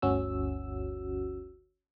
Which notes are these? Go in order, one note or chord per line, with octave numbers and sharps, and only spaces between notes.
G1 D2 C#4 F#4 E6